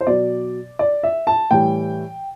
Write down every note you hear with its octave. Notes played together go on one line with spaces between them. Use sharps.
C5
B2 F#3 D5
D5
E5
A5
A2 E3 G3 G5